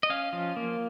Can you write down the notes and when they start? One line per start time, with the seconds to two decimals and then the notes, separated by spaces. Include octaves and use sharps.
0.03 D#5
0.10 C#4 F5
0.33 F3
0.57 A#3